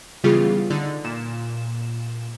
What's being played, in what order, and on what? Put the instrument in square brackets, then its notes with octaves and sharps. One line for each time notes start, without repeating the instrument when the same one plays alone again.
[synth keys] C#3 E3 G3 B3 F4 G#4
D3 D#4 D5
A#2 E7